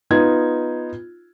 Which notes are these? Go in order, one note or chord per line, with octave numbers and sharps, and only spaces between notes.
B3 D#4 F4 G#6